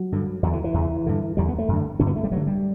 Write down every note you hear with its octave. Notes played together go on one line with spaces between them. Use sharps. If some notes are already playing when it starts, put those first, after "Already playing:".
Already playing: F#3
G2 D3
E2 D3 F#3
E3
E3
E2 C#3
G2 D3
E2 D3 G3
B3
A3
F#2 D3
G2 D3 C#4
B3
A3
G3
G2 D3 F#3
G3